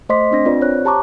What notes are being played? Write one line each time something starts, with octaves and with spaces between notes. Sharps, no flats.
A3 C5 D#5 C6 D6 B6
C4 D4 A#6
C4 F4 B4 D5
C5 C#5 F#6
G4 A5 A#5 C#6 D6